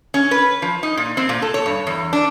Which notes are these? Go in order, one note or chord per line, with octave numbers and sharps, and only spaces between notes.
C#4
B4
F3
D#4
A#2
C4
A#2
A4
C#5
G2
E2
D4